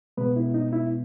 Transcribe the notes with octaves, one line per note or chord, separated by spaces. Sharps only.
B2 G#3 B3 B4
E4
D#4
E4